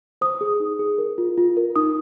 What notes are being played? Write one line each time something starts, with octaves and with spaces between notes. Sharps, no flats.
C5 D#6
G#4
D#4
G#4
A#4
F4
F4
A#4
D#4 D#6